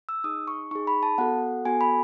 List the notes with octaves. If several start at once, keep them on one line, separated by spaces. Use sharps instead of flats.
E6
D#4 G#4 D#6
C#6
D#4 G#4 C#6
B5
A5
B3 F#4 A4 F#5
B3 F#4 A4 G#5
B5